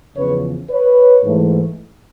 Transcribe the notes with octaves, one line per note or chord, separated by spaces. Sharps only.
E2 C#3 F3 B4 C#5
B4 C#5
G#2 E3 A3